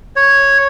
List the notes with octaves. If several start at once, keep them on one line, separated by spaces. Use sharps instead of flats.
C#5